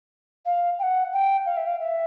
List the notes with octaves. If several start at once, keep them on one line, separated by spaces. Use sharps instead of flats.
F5
G5
F#5
G5
F5
E5
F5
E5